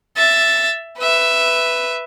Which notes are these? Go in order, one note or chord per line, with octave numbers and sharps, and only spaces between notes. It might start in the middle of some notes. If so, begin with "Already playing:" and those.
E5 A6
B4 E5